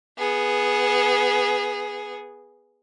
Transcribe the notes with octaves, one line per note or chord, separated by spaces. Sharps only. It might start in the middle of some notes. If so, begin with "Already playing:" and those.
B3 G#4